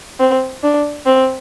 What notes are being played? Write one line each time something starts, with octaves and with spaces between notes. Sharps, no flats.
C4
D4
C4